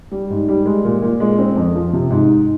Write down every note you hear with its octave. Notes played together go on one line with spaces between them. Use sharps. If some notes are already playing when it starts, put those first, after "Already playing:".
G3
G#2
G3
G#3
A#2
A#2
G#3
C4
F2
F3
C3
G#2
D#4